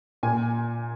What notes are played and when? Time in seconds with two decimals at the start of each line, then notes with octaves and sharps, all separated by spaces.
0.23 A#2 G#5